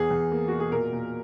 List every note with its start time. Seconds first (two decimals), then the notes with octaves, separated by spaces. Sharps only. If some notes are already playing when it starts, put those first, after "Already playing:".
Already playing: E2 G#4
0.10 E2
0.32 A#3
0.48 B2 F#4
0.60 G#4
0.72 A#2 A#4
0.92 A#2